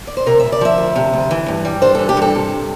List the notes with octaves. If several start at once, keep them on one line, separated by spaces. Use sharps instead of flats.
D5
C5
C3 A#4
D2 E5
D5
F3 E5
D2
C3
D2
E3
G2
G3
D4 C5
E3 A4
G4
G2 A4
C3